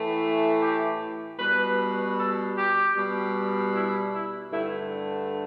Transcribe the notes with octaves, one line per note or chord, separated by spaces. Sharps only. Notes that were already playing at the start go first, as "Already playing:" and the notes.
Already playing: A2 E3 A3
G4
B2 G3 B4
A4
G4
B2 G3
E4
E4
G2 D3 A3 E4